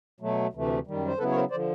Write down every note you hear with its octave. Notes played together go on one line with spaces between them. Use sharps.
B2 F#3 A3
D2 C3 E3 A3
F#2 D#3 G3
C5
C#3 F#3 B3 E4 A4 B4
C#5
A#4 C5
D3 F3 C5 D5